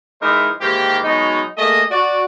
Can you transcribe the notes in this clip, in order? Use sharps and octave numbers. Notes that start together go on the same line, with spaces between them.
E3 G#3 D#4 A#4 C5 E5
G#2 D#3 E3 A#3 G4
B2 F#3 G#3 D#4
A3 A#3 G#4 D#5
F#4 D5